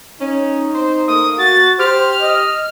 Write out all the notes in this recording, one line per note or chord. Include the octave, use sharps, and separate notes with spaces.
C#4 D#4
C4 C5
A3 A#3 D#6
F#4 A6
G4 C5 F6
D#5